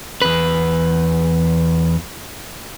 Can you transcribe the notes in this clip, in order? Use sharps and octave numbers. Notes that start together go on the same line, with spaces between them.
E2 B4